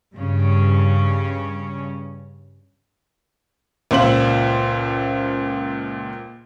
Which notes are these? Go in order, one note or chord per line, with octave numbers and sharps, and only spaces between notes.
G2 C#3 C#4
C#2 A#2 C5 E5 F#7